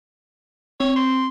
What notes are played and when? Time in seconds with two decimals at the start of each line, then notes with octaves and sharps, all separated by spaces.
0.80 C4 C#5
0.96 C6